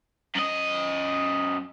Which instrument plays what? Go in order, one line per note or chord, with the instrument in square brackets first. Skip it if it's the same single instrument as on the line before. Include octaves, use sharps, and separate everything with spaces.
[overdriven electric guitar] F#2 D#5